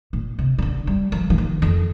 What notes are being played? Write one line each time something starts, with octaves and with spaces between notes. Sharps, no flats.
A#2
C3
D#3
D3
G3
F3
F3
D#3
F2